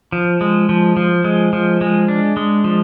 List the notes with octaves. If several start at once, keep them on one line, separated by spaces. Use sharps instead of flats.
F3
G#3
F3
F3
G#3
F3
G#3
D4
G#3
F3